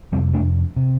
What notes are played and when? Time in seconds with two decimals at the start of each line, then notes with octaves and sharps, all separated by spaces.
0.12 F2 C3 G3 C4
0.33 A3 D4
0.76 C3